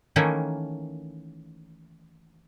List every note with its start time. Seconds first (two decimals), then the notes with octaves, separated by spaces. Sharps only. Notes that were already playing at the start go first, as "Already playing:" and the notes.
0.16 D#3 E3 A3 A#3 C#4